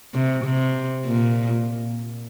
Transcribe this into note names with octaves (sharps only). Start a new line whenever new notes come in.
C3
C3
A#2